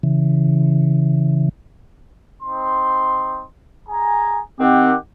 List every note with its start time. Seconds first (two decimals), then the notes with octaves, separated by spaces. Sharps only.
0.03 C#3 E3
2.42 C4 D#4 C6
3.88 G#4 G#5 A#5
4.60 D#3 C4 G4 F#5